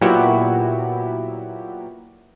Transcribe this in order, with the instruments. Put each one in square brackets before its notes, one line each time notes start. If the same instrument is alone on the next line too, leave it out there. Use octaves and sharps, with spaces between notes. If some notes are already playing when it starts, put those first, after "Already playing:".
[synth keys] A#2 F#3 B3 E4 F#4 G4